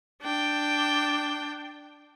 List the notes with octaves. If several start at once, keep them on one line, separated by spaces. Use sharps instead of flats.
D4 G5